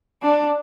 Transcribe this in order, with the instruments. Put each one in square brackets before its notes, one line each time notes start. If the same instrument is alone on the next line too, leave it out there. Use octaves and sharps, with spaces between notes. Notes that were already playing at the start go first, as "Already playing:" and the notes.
[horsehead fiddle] D4